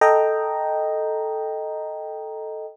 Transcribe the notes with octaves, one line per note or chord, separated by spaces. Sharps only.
A4 D#5 G5 A#5